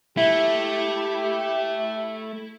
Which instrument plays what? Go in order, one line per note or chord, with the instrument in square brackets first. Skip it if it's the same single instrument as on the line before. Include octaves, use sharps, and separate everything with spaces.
[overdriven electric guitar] A3 [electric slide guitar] E4 [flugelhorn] G4